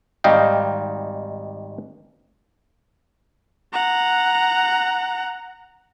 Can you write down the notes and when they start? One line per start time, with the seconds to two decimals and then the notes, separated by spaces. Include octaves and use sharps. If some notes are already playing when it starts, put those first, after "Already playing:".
0.24 G#1 G3 D#4 D#5 F5 G5
3.73 F#5 A#5